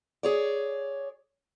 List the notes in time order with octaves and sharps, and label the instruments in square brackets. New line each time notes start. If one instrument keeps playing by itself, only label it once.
[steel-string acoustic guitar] G#4 C#5 D5